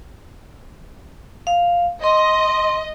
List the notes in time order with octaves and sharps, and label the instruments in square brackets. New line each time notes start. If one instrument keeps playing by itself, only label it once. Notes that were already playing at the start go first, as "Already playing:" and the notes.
[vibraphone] F5
[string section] D#5 [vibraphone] C6